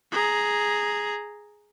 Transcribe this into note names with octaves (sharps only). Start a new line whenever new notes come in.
G#4 A#5